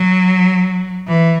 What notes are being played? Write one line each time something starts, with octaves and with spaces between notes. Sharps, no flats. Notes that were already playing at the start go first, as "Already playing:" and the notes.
Already playing: F#3
E3